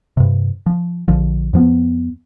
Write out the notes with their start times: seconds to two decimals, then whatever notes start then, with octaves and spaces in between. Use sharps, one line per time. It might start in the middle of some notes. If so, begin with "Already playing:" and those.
0.17 G2 C3
0.66 F3
1.08 A#1 D3 F3
1.53 F2 F3 B3